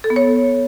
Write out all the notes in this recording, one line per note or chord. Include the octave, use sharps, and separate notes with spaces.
A4
B3
C#5